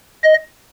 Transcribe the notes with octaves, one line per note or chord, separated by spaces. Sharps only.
D#5